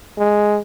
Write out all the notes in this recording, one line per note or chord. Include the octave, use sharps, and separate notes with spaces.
G#3